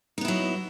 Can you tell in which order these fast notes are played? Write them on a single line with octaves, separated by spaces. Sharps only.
D#4 B3 E4 F#3